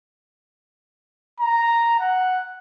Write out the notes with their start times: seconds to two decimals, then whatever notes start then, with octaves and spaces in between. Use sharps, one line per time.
1.40 A#5
2.00 F#5